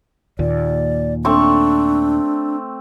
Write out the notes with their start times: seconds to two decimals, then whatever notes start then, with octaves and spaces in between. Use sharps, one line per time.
0.39 D#2 A#2 D5
1.25 A3 C4 D4 C#6